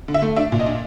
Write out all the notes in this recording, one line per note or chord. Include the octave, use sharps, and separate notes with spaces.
D3
E5
A3
D4 E5
A#2
D#5
D4